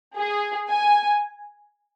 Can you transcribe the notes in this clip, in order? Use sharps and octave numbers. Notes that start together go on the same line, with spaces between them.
G#4
G#5